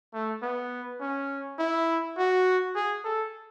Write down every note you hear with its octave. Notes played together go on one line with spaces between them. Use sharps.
A3
B3
C#4
E4
F#4
G#4
A4